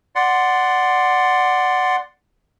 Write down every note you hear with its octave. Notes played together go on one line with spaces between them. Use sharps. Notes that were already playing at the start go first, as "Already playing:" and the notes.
D5 F#5 C6